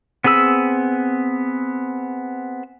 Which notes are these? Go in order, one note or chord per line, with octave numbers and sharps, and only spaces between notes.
B3 C4 G#4 B5 E6